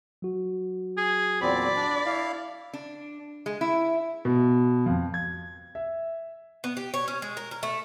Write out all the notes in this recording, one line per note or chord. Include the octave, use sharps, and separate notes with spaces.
F#3 F#4
G#4
E2 A#2 C4 D5 B5
D4
E4 F5
D4
G#3
E4
B2
F2
G#6
E5
B3
G4
C#5
C#4
G#3
A#4
A#4
A3